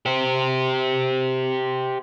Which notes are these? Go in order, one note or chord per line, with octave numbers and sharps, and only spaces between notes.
G4 C5